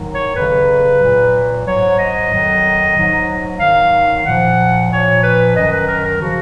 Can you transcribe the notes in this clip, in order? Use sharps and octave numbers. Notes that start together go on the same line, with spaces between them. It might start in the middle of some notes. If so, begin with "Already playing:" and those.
Already playing: G#2 D#3 F#3
C#5
F2 C#3 F#3 B4
A#2 F#3
G#2 F#3 C#5
D#5
F2 D#3 F#3
G#2 F#3
G#2 D#3 F#3 F5
A#2 F3 F#5
A#2 F3 C#5
B4
F#2 D#3 F#3 D#5
B4
A#4
A#4
C#3 F3 F#4